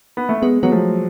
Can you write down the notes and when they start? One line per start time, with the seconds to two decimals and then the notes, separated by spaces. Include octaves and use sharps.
0.17 B3
0.29 A3
0.42 G#3 B3
0.63 F#3 B3
0.72 F3 A3